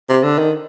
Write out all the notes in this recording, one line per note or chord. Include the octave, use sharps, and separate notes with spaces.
C3
D3
D#3